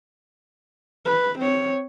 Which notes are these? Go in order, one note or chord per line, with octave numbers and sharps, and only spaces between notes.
B4
C4 C#5